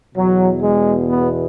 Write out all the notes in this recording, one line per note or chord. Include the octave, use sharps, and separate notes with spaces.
E2 B2 F#3
G#3
B3